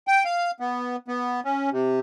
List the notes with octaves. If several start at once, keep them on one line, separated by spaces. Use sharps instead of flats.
G5
F5
B3
B3
C#4
C3